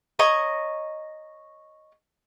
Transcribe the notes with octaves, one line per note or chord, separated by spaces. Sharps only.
C#5 D#5 A#5 C#6